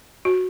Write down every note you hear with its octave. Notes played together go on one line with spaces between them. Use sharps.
F#4